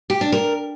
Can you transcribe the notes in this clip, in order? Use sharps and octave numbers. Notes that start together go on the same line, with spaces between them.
G4
D4
A#4